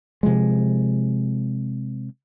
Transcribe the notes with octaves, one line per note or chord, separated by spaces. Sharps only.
C3 F3 G#3